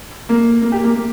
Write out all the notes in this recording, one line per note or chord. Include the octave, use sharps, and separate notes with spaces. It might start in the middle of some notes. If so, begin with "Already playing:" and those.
A#3
A#3
G4
A#3
A#3